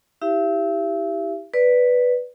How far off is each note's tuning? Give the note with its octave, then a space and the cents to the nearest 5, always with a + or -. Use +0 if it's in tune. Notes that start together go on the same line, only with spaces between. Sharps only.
E4 -30 G4 +0 E5 +40
B4 +0 D5 +0